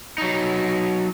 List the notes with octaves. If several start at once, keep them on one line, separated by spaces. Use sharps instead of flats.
F#3 D#4